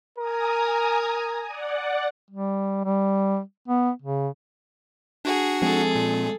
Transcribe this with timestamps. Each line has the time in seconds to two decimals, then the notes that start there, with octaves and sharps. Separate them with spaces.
0.18 A#4 G#5 A#5 D#6
1.46 D5 F#5
2.30 G3
2.85 G3
3.68 B3
4.02 C#3
5.25 D4 F#4 G#4 F#5
5.62 F3 G#3 C4 G#4 A4
5.95 A#2